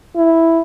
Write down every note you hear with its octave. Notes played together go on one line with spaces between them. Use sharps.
E4